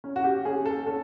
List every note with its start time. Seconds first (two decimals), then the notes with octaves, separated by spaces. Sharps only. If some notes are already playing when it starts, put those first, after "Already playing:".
0.04 C#4
0.16 F#4
0.24 G4
0.45 C#4 G#4
0.66 A4
0.87 C#4 A4